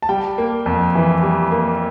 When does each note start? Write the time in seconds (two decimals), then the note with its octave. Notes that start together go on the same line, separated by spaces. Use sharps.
0.02 A5
0.09 G3 G5
0.38 A#3
0.66 F2
0.95 E3
1.23 G3
1.52 A#3